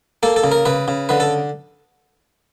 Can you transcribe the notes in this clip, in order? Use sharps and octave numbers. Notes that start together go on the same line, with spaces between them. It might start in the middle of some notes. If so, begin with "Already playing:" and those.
A#3 A4
A4
C#3
A#4
C#3 B4
C#3
D3 B4
A4